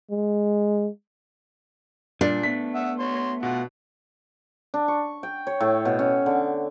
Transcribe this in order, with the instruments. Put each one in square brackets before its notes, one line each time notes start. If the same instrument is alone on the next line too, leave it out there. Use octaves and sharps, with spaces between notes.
[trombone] G#3
[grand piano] A#2 [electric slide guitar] G3 [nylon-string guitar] D4
[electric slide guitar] A3 B3 [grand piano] B6
[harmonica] E5 F#5
F#4 C#5 C6
[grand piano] B2 [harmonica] F4 F#5
[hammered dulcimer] D4
C#6
G5
C#5
A2
B2
C#4
D3